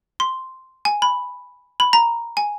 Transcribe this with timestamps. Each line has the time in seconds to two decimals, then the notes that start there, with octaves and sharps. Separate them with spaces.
0.20 C6
0.85 G#5
1.02 B5
1.80 B5
1.93 A#5
2.37 G#5